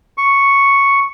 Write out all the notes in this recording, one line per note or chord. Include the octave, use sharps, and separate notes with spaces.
C#6